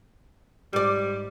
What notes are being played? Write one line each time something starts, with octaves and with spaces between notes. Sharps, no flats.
G#2 G3 D5